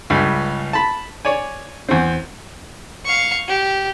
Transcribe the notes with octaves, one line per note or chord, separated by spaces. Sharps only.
C#2 G2 C#3
A5 B5
C#5 D5 G#5
E2 C4
F5 C#6
G4